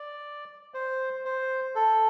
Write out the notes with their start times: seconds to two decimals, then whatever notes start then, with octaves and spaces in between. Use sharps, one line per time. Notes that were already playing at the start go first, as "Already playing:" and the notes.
Already playing: D5
0.74 C5
1.25 C5
1.75 A4